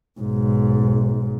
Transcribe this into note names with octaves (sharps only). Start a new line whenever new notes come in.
B1 G#2